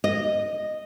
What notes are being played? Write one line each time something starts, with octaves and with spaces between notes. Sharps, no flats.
D#5